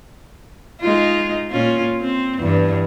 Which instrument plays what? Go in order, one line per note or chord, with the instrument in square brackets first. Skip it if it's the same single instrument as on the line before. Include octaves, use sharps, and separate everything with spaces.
[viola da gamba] G#3 D#4 F4
A#2 C#4 F4
C4
E2 G2